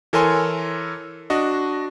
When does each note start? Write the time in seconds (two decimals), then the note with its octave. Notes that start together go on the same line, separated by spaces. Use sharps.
0.13 E3 A4 A#4 C#5 G#5 C6
1.30 D4 F#4 D#5